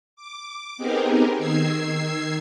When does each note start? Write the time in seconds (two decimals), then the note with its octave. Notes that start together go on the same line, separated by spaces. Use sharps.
0.16 D6
0.77 B3 C4 D#4 G4 G#4 A#4
1.38 D#3 E6 G#6 C7